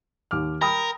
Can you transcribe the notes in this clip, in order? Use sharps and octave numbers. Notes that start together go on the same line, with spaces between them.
D#2 D6 F6
A#4 G5 B5 D#6